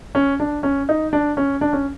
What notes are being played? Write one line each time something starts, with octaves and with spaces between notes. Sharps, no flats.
C#4
D4
C#4
D#4
D4
C#4
D4
C#4